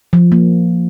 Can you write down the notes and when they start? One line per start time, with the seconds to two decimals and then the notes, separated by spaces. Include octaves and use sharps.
0.13 F3
0.32 A#3